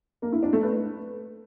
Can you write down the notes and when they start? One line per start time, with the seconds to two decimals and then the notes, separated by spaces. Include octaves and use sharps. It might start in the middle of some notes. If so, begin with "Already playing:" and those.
0.22 A#3
0.32 E4
0.43 D4
0.53 A3
0.63 B4